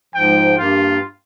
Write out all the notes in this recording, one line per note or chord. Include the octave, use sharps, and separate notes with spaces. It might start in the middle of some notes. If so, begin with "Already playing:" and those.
G#2 F3 G5
G2 A#3 F4